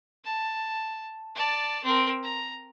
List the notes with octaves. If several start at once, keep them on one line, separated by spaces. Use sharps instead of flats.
A5
D5 A5
C4 A#4
A#5